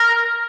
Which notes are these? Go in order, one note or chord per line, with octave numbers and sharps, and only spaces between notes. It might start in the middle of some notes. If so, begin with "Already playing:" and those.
Already playing: A#4